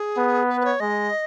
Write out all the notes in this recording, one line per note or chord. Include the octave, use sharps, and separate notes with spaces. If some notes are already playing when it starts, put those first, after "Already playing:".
Already playing: G#4
B3
B4
B4
C#5
G#3 D#5